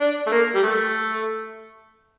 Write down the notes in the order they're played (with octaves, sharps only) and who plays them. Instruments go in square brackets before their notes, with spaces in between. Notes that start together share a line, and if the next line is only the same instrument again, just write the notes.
[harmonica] D4
A3
A#3
G3
A3